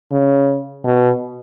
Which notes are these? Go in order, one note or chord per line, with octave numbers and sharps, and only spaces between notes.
C#3
B2